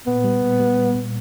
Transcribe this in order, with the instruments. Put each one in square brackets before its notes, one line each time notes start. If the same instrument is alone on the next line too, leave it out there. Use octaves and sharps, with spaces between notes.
[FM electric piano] A#2 [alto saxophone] B3
[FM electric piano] G3
A#2
G3
G3
A#2